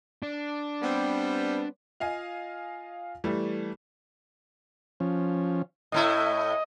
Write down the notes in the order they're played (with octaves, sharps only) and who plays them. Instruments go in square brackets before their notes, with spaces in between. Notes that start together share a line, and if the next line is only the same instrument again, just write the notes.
[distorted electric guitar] D4
[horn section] G3 B3 C4
[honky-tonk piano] F4 D#5 F5 G#5
E3 G3 A3
[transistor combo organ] F3 C#4
[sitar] A2 A3 E4 [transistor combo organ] D#5